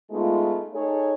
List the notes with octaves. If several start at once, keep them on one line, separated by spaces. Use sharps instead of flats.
G#3 A3 B3 D#4 F4
D#4 G#4 A4 C#5